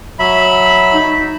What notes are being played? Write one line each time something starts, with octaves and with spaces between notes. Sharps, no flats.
F#3 E5 B5
D#4